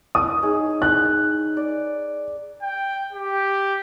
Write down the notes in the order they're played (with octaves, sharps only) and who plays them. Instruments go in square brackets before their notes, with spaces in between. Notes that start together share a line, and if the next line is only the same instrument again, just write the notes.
[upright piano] D#6
[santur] D#4 G#4 C#5
[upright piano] F#6
[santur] D5
[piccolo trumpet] G5
G4